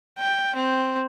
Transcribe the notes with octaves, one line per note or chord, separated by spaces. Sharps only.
G5
C4